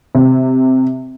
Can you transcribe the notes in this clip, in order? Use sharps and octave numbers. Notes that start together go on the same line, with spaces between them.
C3